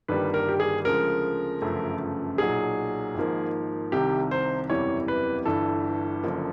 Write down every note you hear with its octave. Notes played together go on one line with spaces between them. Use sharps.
G1 G2 D#3 G3 A#3 B4
A#4
G4
G#4
D2 C#3 F3 G#3 A#4
G1 F#2 C#3 F3 A3
B1 A#2 F#3 G#4
G#1 G#2 F3 A#3
C2 C3 D#3 G4
C5
F#1 E2 C3 E3 G3 C#5
B4
G1 G2 E3 A4
F#1 F#2 D3 F3 A#3